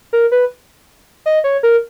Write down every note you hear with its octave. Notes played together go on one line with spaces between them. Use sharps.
A#4
B4
D#5
C#5
A#4